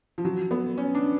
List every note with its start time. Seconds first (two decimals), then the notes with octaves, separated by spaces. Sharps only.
0.18 F3
0.25 F#3
0.51 B3
0.77 C#4
0.95 D4